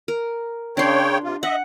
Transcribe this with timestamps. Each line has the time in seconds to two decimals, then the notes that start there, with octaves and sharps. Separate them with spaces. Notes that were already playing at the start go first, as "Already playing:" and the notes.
0.08 A#4
0.77 C#3 D4 C#5 G5 C6
1.24 C3 F4
1.43 D#5 E5 F#5